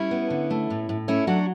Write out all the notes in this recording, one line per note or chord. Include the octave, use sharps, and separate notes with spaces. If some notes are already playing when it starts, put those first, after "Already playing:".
Already playing: G3 C#4 E4
B3
D3
A3
A2
A2
A3 C#4 E4
F#3 D4 F#4